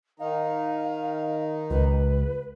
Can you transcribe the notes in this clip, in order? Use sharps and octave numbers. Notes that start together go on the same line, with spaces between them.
D#3 D#4 F5
C#2 B4